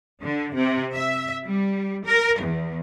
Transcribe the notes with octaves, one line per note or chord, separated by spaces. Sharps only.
D3
C3
E5
G3
A#4
E2